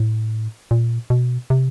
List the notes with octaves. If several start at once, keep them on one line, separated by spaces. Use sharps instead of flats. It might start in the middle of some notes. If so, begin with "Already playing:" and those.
Already playing: A2
A#2
B2
C3